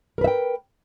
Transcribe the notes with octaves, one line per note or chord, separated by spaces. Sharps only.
A#4 B4 E5 G5